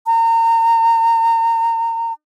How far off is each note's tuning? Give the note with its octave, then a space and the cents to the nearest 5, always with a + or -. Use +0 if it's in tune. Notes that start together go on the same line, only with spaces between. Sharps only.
A#5 -30